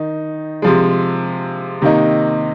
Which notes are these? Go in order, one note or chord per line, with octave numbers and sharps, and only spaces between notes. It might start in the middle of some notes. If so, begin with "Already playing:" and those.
Already playing: D#3 D#4
C3 F3 G#3
C3 D#3 A#3 D#4